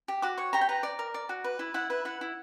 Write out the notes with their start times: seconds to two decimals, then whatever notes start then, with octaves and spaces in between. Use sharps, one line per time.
0.08 G4
0.22 F#4 D6
0.38 C#5 C#6
0.53 G4 A#5
0.61 G5
0.69 B4 A#5
0.83 D5
0.99 A#4
1.14 D5
1.29 F#4
1.44 B4
1.59 E4
1.74 E4 F#5
1.90 B4 E5
2.05 E4 F#5
2.21 E4